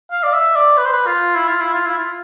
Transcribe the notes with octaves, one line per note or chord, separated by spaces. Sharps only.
F5
D5
E5
D5
B4
C5
B4
F4
E4
F4
E4
F4
E4
F4